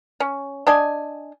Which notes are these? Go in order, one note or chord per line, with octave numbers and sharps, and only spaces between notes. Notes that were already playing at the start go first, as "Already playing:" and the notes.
C#4
D4 D#5 G#5